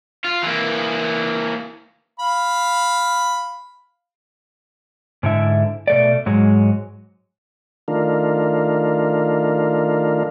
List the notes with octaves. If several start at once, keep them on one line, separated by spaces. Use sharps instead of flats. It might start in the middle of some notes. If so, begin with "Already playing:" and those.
F4
E3 A#3
F5 B5
G#2 D3 E4 E5
B2 A3 D5
G#2 F#3 G#3
D#3 A3 D4 F4 A#4